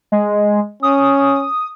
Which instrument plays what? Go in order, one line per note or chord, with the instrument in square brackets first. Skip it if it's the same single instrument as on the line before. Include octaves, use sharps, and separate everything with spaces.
[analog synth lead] G#3
[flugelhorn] C#4 [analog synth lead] D#6